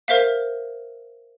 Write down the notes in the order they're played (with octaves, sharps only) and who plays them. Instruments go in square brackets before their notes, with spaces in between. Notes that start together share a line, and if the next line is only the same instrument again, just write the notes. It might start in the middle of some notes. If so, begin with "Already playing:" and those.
[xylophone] A#4 C5 E5 F5